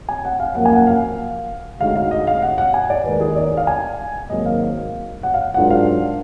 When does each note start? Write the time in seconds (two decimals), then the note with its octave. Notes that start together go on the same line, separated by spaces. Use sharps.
0.09 G#5
0.25 F#5
0.40 F5
0.55 F#2 F3 A#3 F#5
0.65 G#5
0.76 F#5
0.87 F5
1.80 D2 D3 G#3 D#4 F#4 F5
1.96 F5
2.11 D#5
2.27 F5
2.42 F#5
2.58 F#5
2.74 G#5
2.90 D5
3.05 D#2 D#3 G#3 D#4 A#4 B4
3.20 G#4
3.36 D5
3.47 D5
3.57 F5
3.67 G#5
4.30 G#1 G#2 F#3 A#3 D#5
4.46 F5
5.23 F#5
5.34 F5
5.54 G#2 F#3 D4 F4 A#4 F#5
5.70 F5